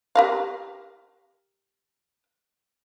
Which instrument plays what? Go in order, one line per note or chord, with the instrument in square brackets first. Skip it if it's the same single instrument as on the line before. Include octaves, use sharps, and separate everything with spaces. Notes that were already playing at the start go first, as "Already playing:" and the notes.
[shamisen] G4 A#4 F5